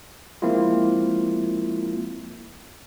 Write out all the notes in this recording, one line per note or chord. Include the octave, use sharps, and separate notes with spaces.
F3 G#3 A#3 C4 E4 F4